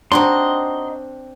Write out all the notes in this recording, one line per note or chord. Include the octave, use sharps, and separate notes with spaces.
C4 D4 D#4 F#4 D#5 C6